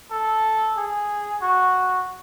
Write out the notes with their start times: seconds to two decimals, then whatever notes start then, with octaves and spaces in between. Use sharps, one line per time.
0.11 A4
0.77 G#4
1.42 F#4